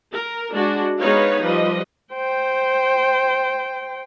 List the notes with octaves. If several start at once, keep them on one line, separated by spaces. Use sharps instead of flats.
A#4
G#3 D4 F#4
G#3 B3 D#4 B4 C#5 F5
F3 G3 B4 D#5
C5 G5